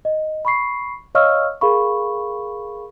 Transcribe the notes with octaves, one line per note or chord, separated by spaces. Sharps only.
D#5
B5 C#6 C7
C#5 D#5 F5 C#6 E6 F6
G#4 A#4 F5 B5 C#6